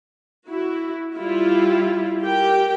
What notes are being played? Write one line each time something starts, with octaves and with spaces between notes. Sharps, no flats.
E4 F#4
G3 E4 F4
G4 A#4 G5